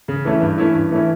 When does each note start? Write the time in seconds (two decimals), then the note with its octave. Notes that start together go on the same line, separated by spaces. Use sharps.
0.08 C#3
0.25 E3 A3 C#4 E4
0.41 G2
0.58 E3 A3 C#4 E4
0.75 G2
0.91 E3 A3 C#4 E4